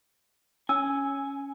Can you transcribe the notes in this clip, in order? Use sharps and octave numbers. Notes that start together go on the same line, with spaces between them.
C#4 G#5 E6